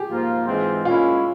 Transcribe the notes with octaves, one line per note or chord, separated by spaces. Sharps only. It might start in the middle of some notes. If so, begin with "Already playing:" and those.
Already playing: G4 G#4
G#2 F3 A#3 F4
G#2 E3 G#3 C4 F4
A#2 G#3 C#4 E4 F4